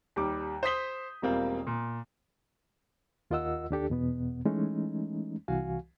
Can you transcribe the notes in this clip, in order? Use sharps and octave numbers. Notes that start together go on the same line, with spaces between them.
D#2 G3 D6
C5 D#6 B6 G7
E1 G3 A#3 C4 F4
A#2
D#2 F4 A#4 D#5 F#5 E6
D#2 D4 G4 A4
E2 B2 B3
E3 G#3 A3 C#4 D#4
C2 E3 F#4 F5 G#5